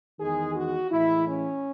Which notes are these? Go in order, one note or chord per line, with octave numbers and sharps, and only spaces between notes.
E2 D#3 G#3 G#4
F#4
A2 E3 G#3 E4
C#4